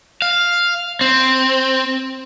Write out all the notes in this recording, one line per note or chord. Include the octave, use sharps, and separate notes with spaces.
F5
C4